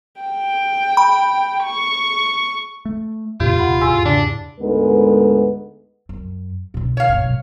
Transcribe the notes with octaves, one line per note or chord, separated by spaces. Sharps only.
G5
B5
C#6
A3
F2 A#2 C#3 F4 G4
D#1 C3 F#5 B5
E2 G#2 E6
C#3 D4
D2 G#2 G#3 B3 A4 A#4
F#2
B2 D3
C#5 F5
G2 B2
A#2 G3